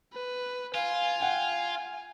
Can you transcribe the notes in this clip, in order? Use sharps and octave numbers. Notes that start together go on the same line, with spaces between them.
B4
F4 F5 G#5
F#5 G5